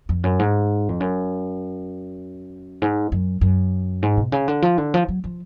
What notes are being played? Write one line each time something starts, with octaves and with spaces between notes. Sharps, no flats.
F2
F#2
G#2
F2
F#2
G#2
F#2
F#2
G#2
B2
C#3
D3
F3
D3
F3
F#3
F3